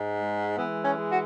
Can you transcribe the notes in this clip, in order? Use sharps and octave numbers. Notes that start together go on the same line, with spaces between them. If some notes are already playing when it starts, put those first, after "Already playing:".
Already playing: G#2
G#3
E3 B3
C#4
G#3
F#4